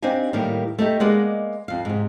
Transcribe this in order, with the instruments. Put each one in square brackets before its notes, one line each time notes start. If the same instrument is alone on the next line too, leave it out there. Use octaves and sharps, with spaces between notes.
[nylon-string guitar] C4 D4 D#4 G4 F5 G#5
A2 D#3 G3 A#3
A3 D#4 G4
G#3 A#3 B3 D5 D#5 F#5
F2 F5
G#2 C3